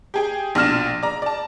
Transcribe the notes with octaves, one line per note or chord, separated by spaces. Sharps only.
G4 G#4 G5
A#1 B2 D4 F6 A#6 E7
D5 A#5
D5 A5